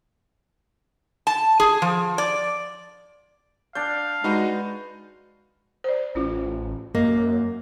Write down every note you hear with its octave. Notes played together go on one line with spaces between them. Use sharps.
A5
G#4
F3
D5
D4 D5 F5 G6
G#3 D#4 F#4 B4 D#5
C5 D5
A1 C#4 E4 F4
F#2 A#3 D#5